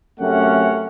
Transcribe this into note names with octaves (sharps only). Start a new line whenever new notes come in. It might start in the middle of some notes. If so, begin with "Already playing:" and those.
F#2 C3 A3 C#4 A#4 F#5